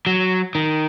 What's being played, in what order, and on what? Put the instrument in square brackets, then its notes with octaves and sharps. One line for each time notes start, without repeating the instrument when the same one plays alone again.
[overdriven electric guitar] F#3
D#3